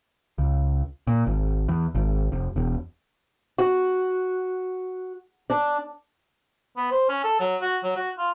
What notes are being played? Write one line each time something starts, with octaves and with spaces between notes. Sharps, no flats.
C#2
A#2
G#1
E2
G#1
F1
E1
F#4
D4
B3
C5
C#4
A4
F#3
F#4
F#3
F#4
F4